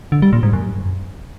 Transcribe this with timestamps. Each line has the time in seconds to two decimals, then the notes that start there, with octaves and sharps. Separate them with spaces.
0.12 D3
0.22 G3
0.33 A#2
0.43 G#2
0.53 F#2